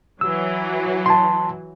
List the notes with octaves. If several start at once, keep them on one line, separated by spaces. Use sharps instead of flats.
E3 F#3 E6
A5 C6